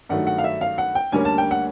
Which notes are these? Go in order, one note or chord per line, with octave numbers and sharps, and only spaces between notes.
G2 D#3 F#3 A3 F#5
F#5
F5
E5
F5
F#5
G5
D2 D3 G3 A#3 C#4 G#5
A5
G5
F#5